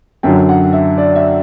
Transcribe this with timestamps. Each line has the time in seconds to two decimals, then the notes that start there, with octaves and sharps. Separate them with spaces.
0.23 F#2 D3 F#3 G5
0.49 F#5
0.73 E5
0.98 D5
1.15 E5